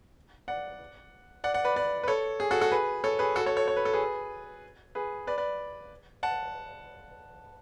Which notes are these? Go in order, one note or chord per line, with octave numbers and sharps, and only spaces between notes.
D5 F#5
D5 F#5
D5 F#5
B4 D5
B4 D5
B4
A4 C#5
G#4
F#4 A4
F#4 A4
G#4 B4
A4 C#5
G#4 B4
F#4 A4
A4 C#5
A4 C#5
C#5
B4
A4
G#4 B4
G#4 B4
B4 D5
B4 D5
F#5 A5